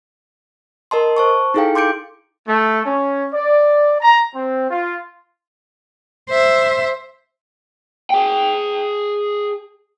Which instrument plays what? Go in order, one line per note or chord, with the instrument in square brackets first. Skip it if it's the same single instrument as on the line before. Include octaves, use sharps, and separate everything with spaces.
[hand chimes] A#4 D#5 A5 C6
C5 A5 C#6
D#4 E4 G#4 A4 F5 G5
C6 D6 G6 C#7 D7
[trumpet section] A3
C#4
D5
A#5
C4
F4
[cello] C5 E5
[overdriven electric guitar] G#4 G5